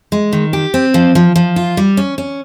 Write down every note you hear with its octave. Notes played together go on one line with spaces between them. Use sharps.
G#3
D#3
G4
C4
F3
F3
F3
F4
G3
C#4
C#4